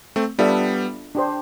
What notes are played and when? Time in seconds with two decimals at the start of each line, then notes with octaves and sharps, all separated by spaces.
0.16 A3 C4
0.39 G3 B3 D4 F4 A4 E5
1.15 D4 G4 C5